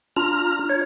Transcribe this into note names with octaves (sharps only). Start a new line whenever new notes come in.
D4 F4 A#5 F6
C#5